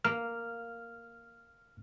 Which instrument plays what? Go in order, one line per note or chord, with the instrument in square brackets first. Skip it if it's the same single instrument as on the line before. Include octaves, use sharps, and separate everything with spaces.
[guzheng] A#3 [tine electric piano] F6